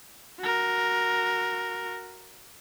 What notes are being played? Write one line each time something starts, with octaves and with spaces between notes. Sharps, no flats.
F#4 A#4